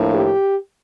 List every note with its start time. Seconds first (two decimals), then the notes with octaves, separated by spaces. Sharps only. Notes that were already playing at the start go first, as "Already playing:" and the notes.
Already playing: A2 F3 A#3 D4
0.14 G4